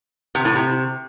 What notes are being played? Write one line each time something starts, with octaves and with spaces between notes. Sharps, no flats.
C3
A2
C3